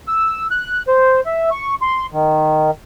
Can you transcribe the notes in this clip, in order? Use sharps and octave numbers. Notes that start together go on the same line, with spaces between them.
E6
F#6
C5
E5
C#6
C6
D#3